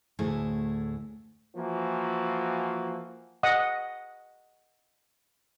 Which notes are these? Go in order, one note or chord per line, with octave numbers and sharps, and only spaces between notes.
D2 A2 A3 E4 G#4
E3 F3 A#3 F#4
D#5 F#5 D#6